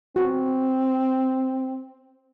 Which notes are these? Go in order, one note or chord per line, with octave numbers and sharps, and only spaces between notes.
C4 F#4